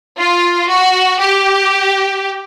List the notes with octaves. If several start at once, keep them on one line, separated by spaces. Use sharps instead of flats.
F4
F#4
G4